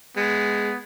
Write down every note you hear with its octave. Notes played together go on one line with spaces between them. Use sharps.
G#3 B3